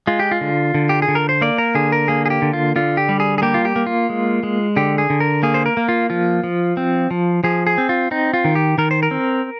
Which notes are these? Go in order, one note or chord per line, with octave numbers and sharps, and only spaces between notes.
G#3 F4
G4
F4
D3
D3
G4
G#4
D3
A#4
C5
A#3 D5
A#4
D3 G#4
A#4
A#3 G#4
G#4
G4
D3
F4
D3 F4
G4
G3
G#4
G#4
A#3 G4
F4
G4
A#3
F4
G#3
G#3
D3 G4
G#4
D3
A#4
A#3 G#4
C5
A#4
A#3
F4
F3 F4
F3
C4
F3
F3 G#4
G#4
C4
F4
C4 D#4
F4
D#3
G4
D#3 A#4
C5
A#4
C4